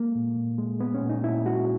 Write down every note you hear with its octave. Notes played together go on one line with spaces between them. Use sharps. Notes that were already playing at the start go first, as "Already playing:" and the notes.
Already playing: G#3 A#3
A#2
A#2
G#3
G#3 B3
C#4
A#2
D#4
A#2 E4
G#3 F#4